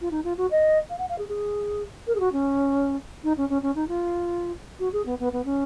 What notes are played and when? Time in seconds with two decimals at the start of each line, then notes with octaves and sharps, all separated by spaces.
0.01 F4
0.11 D#4
0.24 F4
0.38 F#4
0.51 D#5
0.90 F5
0.99 F#5
1.09 F5
1.18 G#4
1.29 G#4
2.07 A#4
2.15 G#4
2.20 F#4
2.32 C#4
3.24 D#4
3.37 C#4
3.49 C#4
3.62 C#4
3.75 D#4
3.88 F4
4.79 F#4
4.93 G#4
5.06 B3
5.19 B3
5.33 B3
5.45 C#4